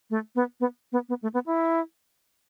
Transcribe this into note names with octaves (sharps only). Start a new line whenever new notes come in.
A3
B3
B3
B3
B3
A3
B3
E4